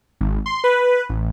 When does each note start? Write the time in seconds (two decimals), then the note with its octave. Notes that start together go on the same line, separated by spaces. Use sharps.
0.21 G#1
0.46 C6
0.64 B4
1.09 A1